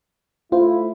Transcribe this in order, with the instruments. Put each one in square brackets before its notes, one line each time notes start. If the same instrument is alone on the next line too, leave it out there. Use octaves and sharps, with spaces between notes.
[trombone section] A3 E4 [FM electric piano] F4 C5